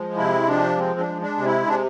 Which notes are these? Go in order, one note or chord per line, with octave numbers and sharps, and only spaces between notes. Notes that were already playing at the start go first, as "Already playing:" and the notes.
Already playing: F3 G#3
C3 E4
F3 D4
G#3 C4
D4
G#3
D4
C3
E4
C3 D4